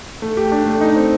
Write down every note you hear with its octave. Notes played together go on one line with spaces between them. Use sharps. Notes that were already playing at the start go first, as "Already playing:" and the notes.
A3
G4
D4
A3
D#4
C4